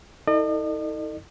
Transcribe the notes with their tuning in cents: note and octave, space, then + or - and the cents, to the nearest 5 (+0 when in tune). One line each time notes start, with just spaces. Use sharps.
D#4 +45 A4 +25 D#5 -45